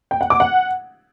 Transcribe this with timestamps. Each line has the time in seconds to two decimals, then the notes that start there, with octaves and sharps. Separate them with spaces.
0.11 G5
0.21 F#5
0.30 D6
0.40 F#5